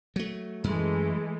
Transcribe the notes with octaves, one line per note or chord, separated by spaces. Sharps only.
F#3 A3
F#2 E3 G#3 A3